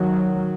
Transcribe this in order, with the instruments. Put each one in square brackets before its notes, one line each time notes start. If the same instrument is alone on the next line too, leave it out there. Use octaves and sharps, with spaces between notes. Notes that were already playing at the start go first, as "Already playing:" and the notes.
Already playing: [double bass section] D#3 F#3